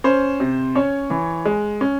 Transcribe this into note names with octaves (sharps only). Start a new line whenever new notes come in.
C#4 C5
C3
C#4 C#5
E3
G#3
C#4